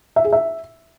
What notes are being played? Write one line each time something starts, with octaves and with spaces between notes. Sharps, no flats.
E5
G#4
E5